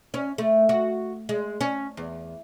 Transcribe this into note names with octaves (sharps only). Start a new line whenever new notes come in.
C#4
A3
F#4
G#3
C#4
E2